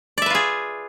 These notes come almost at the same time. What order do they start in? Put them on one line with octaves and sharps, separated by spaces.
D5 E5 B4 F4 G#4